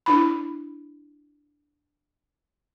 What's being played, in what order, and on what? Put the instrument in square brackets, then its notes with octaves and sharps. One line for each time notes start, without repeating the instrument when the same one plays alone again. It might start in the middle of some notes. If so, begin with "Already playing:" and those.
[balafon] D4 E4 B5